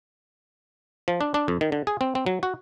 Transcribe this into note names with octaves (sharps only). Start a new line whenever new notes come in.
F3
D4
D4
F2
D#3
D3
G#4
C4
C4
F#3
F#4